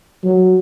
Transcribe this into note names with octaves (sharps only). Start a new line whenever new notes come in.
F#3